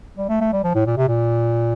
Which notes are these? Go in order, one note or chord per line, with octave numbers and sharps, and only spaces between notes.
G3
A3
A3
G3
F3
A2
A#2
C3
A#2